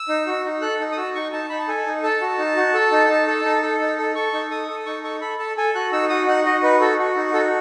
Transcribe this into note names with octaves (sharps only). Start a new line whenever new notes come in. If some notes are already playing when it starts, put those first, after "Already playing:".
Already playing: E6
D#4
F#4
D#4
A4 F#6
D#4
D#6
F#4 E6
D#4 C#6
D#4 A5
D#4 B5
A5
A4 G#5
D#4
A4 A5
F#4
D#4
F#4
A4
D#4
D#4
A4
D#4
A4
D#4
A4
A4 C#6
D#4
A4 D#6
A4
D#4 C#6
A4 C#6
A4 B5
A4 A5
A4 G#5
F#4 F#6
D#4 E6
F#4 D#6
D#4 F#5
F#4 D#5
D#4 B4
F#4 A4
F#4
D#4
F#4 A4